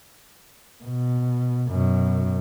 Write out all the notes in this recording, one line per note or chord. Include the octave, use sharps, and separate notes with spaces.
B2
F#2 B2